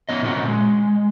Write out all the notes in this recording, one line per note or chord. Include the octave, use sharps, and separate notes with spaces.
B3 C#4 D#5
A#2 D3 C4 C#4 F#4
G#3